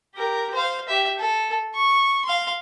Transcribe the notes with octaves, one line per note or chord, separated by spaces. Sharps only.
G4 A#4
C5 F5
G4 E5
A4
C#6
F5 C6